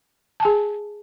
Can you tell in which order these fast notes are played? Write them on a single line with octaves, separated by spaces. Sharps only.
A5 G#5 G#4